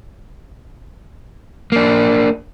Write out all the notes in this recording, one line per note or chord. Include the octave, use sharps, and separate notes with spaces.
A#3 D4